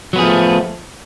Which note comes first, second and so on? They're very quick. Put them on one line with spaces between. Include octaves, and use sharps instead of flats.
F#3 B3 G#4 F3 A3